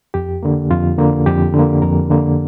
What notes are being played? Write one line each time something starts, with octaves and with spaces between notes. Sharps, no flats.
F2 G4
D3 A#3
F2 F4
D3 A#3
F2 G4
D3
A#3
F2 A#4
D3 A#3